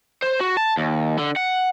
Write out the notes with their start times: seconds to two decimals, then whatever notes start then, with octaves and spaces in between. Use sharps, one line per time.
0.22 C5
0.40 F#4
0.57 A5
0.77 D#2
1.18 D3
1.36 F#5